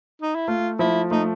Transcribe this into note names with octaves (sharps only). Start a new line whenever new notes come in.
D#4
E4
A3 F4
F3 E4
A3 D#4